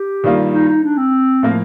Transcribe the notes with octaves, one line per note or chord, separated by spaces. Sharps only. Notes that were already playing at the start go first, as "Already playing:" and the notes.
Already playing: G4
G2 D#3 G3 A#3 F4
D#4
D#4
D4
C4
A2 F3 A#3 F4 A#4